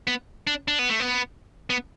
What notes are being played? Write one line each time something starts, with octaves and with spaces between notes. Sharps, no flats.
B3
D4
D4
B3
A3
B3
B3